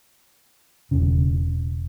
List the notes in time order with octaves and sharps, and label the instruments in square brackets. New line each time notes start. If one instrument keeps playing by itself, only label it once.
[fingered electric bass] E1 C#3